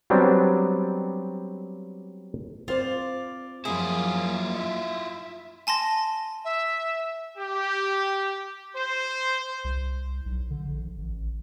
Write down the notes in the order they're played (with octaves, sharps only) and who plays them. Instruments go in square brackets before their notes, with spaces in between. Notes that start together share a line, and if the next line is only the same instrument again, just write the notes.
[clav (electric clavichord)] F#3 G3 B3 C4 D4
[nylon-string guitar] C4 C5 [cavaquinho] F4 D5
[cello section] F#2 F3 A#3 [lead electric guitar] E4 F4 [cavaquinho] G#4
[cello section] E5
[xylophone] G#5 A5 C6 A#6
[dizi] E5
[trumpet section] G4
C5
[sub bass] C2
B1
D3
A#1
A1